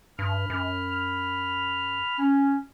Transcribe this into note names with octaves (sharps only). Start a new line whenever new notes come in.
G2 B5 F6
F#2
C#4